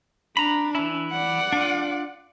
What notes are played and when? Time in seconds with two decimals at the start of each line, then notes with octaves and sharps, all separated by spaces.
0.37 D4 A#5 B5
0.75 E3 E4
1.11 D5 F#5
1.52 D4 F4